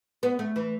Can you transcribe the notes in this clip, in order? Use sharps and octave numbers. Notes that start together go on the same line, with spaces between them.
B3
A3
E3